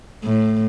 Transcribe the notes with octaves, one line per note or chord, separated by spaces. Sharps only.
A2